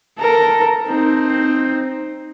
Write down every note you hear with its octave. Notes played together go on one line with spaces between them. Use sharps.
A4 A#4
C4 D#4